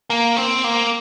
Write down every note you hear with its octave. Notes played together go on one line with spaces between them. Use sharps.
A#3
C4
A#3